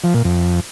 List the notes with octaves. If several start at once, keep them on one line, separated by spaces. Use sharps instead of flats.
F3
A#2
F2